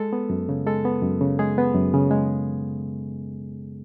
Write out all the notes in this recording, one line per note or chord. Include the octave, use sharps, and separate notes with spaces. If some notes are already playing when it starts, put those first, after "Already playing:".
Already playing: G#3 A4
B3
F#2
C#3
G#3 A4
B3
F#2
C#3
G#3 G#4
B3
F#2
C#3
G#3